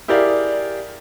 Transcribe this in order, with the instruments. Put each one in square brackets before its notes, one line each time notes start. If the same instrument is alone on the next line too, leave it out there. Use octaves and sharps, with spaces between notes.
[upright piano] E4 G4 G#4 A#4 D5 F5